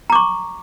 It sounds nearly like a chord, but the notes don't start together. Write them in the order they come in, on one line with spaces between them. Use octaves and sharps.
A#5 D6 C#6